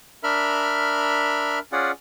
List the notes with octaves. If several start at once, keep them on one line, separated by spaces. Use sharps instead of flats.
D4 A#4 E5 B5 F6
C#4 F4 G#4 D5 F#5